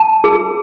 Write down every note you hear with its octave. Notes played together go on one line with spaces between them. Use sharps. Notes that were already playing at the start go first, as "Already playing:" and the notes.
Already playing: A5
G#4